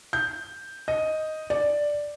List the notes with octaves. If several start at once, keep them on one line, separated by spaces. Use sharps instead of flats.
G6
D#5
D5